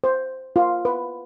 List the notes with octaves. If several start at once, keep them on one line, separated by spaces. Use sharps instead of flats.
C5
F4
B4